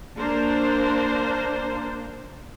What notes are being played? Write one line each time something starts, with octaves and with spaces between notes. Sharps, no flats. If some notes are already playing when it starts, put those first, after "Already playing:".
A#3 D4 A#4 C5